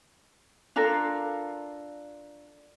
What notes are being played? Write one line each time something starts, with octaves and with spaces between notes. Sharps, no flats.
D4 F4 A4 A#4